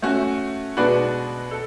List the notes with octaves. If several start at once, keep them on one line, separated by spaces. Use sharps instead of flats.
A3 C#4 F#4
B2 G#3 D4 F#4 B4
A4